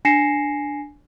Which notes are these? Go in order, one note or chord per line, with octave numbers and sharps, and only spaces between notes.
D4 G#5 A#6 C7 C#7 E7